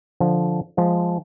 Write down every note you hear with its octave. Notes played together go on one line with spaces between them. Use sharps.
D3 F3
F3 G#3